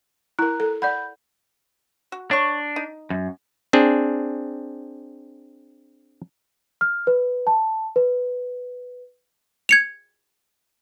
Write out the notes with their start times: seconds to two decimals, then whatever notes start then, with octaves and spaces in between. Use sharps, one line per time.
0.39 E4 A#4 A#5 F#6
0.60 A4
0.82 D5 F#5 B5 G6
2.12 F#4
2.31 D4 C#5 C#6
2.76 D#4
3.10 F#2
3.73 C4 D4 G#4
6.81 F6
7.07 B4
7.47 A5
7.96 B4
9.69 G#6 C#7 F7